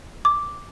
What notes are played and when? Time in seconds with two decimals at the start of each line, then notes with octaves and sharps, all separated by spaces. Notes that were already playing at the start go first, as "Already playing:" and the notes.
0.25 D6